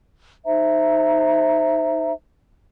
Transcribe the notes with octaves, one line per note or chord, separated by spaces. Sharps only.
D#4 C5 E5 A#5